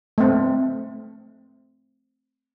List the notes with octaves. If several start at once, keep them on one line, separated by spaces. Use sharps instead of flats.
A3 C4